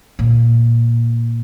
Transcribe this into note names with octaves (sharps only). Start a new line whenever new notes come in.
A#2